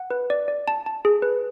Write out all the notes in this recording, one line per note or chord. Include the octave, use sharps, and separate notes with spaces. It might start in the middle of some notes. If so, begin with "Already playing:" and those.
Already playing: F#5
B4
D5
D5
A5
A5
G#4
B4